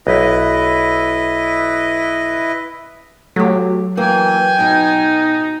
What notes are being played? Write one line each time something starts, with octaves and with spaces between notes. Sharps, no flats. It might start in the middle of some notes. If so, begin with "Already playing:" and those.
B1 E4 B4 D#5
F#3 A3 G4
E3 A#3 G5 G#5
B2 D#4